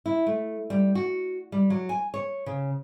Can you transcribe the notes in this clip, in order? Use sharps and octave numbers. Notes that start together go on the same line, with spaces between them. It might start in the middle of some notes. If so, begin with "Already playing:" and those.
E4
A3
G3
F#4
G3
F#3
G#5
C#5
C#3